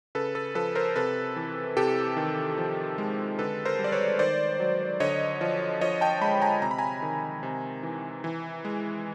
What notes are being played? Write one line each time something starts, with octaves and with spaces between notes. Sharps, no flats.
C#3 A4 B4
A4 B4
F3 A4 B4
A#4 C5
C3 A4 B4
E3
C3 G4 A4
D#3
F3
G#3
D3 A4 B4
A#4 C5
G3
D5
B4 C#5
D#3 C5 D5
F#3
D3 C#5 D#5
F3
F3 C#5 D#5
G5 A5
G#3 A5 B5
G#5 A#5
C3 A#5
B5
G#5 A#5
D#3
C3
E3
E3
G#3